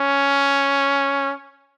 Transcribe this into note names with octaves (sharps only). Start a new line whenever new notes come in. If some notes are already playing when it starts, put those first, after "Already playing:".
Already playing: C#4